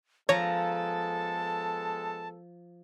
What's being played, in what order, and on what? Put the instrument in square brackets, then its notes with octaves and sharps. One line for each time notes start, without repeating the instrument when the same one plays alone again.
[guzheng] F3 A#5 [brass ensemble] G#3 B3 A4 [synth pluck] C#5 [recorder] A5